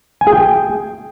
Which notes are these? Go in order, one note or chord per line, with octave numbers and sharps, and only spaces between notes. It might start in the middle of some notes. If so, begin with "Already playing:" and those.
G#5
G#4
G5